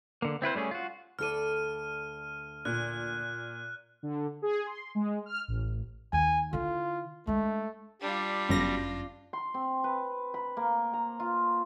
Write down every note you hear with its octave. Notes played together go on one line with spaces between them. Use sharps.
D3 A#3
C4 E4 B4 C5
G3 A3 C#4 G#4
F4 F#4
D2 A4 D5 F6 D#7
A#2 F#6
D3
G#4
C6
G#3
F6
A1
D#2 G#5
D3 E4 F4
G#3 A3 D4
G3 D4 F4
G1 F#2 C#4 A#6
C6
C4
B4
B5
A#3
A#5
F4